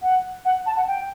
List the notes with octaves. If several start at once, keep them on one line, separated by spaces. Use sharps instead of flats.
F#5
F#5
A5
F#5
G5